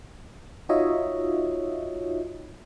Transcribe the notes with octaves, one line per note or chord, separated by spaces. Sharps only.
D#4 F4 F#4 C#5 D#5 E5